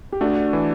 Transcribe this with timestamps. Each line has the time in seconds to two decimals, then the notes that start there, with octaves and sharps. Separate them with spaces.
0.12 G4
0.21 A3 D4 F#4
0.53 E3